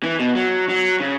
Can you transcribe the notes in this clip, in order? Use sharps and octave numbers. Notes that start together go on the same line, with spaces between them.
E3
B2
F#3
F#3
C#3